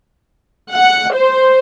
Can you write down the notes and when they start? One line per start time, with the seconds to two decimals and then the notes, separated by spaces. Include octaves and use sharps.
0.73 F#5
1.14 C5